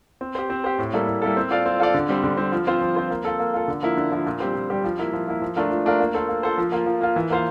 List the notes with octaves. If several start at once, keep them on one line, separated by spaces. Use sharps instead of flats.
C4
G4 C5
C4
G4 C5
A2
G3 A#3 E4 A4
A2
G3 A#3 E4 A4
C4
F4 A4 D5 F5
C4
F4 A4 D5 F5
D3
G3 C4
D3
G3 C4
F3
C4 F4 C5
F3
C4 F4 C5
A#3
F4 A4
A#3
F4 A4
D3
F3 A#3 E4
D3
F3 A#3 E4
A#2
G3 C4 G4 C5
A#2
G3 C4 G4 C5
F3
A#3 E4
F3
A#3 E4
F3
A3 D4 F4 A#4
F3
A3 D4 F4 A#4
A#3
F4 A4 C5
A#3
F4 A4 C5
F3
A#3 F4
F3
A#3 F4
E3
A#3 F4 C5 F5